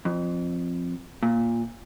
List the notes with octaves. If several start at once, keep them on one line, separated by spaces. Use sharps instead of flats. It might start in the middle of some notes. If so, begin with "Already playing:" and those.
F2
A#2